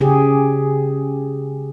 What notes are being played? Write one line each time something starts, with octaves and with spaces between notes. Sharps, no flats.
C#3 G4 G#4